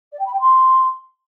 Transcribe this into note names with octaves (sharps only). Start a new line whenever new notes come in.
D5
G5
B5
G5
C6